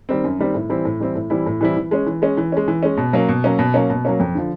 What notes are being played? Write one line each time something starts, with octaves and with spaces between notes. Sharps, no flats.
D#3 G3 C4
F#2
D#3 G3 C4
A2
E3 G3 C4 E4
A2
E3 G3 C4 E4
A2
E3 G3 C4 E4
A2
E3 G3 C4 E4
E3
G#3 C#4
E3
G#3 C#4
E3
G#3 C#4
E3
G#3 C#4
B2
F#3 A#3 C#4
B2
F#3 A#3 C#4
B2
F#3 A#3 C#4
B2
F#3 A#3 C#4
F2
D3 F3